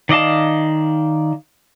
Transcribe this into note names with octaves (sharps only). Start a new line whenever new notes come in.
D#3 D5 D#5 F5 A5